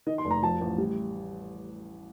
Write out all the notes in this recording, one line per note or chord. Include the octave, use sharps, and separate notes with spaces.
D#3 D#5
C6
F1
A#5
F3 A5
A1
G3